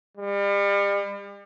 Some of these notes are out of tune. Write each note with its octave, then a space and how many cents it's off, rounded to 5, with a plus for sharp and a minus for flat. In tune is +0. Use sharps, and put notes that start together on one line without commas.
G3 +40